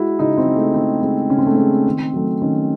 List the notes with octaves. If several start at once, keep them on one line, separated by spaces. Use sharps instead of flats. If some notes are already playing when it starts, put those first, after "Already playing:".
Already playing: G#3 E4 F#4
C#3 D#4
C4
G#3
A3
C#3 C4
G#3 C4
C#3 C#4
C4
A3
G#3 C4
D#3
F#3 A3
D#3 C#4